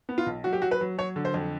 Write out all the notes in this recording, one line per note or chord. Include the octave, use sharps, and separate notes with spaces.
B3
F4
B1
F#3 F#4
G4
F#3 F#4
B4
F#3
F#3 C#5
D3
C5
F2